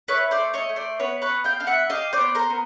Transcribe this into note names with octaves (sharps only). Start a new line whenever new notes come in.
E4 B4 C#5
C5 D5
A3
C#5 D#5
A3
C5 D5
B3 B4 C#5
B4 C#5
B3
F5 G5
D4 F5
E5 F#5
G4 D#5 F5
C5 D5
B3
A#4 C5
B3